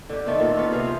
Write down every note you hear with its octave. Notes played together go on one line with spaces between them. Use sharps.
D3 G4
D#3 A3 B3 C4
A#2 A4
B3 F4 F#4 A4
C3 G#4 F5
F3 F4